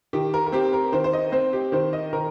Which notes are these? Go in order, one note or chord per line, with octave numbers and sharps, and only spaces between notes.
D#3 G4
A#4
A#4
C4 G4
A#4
D#3 C5
C5
D#5
C4 C5
G4
D#3 C5
D#5
D#3 A#4